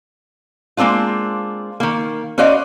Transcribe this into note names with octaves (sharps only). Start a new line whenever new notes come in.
G#3 A#3 C4 D4 F4
D#3 A#3
C#4 F#4 C5 D5 D#5 F5